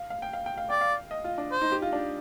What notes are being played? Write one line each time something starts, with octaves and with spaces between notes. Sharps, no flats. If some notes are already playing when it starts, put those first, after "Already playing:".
Already playing: F5
F5
G5
F5
G5
F5
D5 G5
F5
D#5
F4
D4
C5
D#4
G4
F4
D4